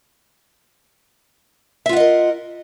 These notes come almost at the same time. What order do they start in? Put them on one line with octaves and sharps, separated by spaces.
E5 F4 F#5 D#5 A#4